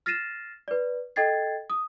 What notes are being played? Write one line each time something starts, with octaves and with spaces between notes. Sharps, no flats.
F6 A6 A#6 C7 D#7 E7
B4 D5
A4 D#5 G5 G#6 A6 C7
D#6